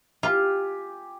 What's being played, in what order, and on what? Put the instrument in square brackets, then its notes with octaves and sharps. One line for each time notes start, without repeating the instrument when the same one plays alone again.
[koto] F4 [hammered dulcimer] G4 G#5